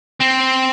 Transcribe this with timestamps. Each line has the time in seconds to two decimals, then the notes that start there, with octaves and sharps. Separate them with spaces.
0.20 C4